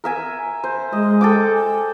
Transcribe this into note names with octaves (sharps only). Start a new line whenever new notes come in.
A#4 E5 G#5
C5
G#3 D#5
A4 G5 D6
G#5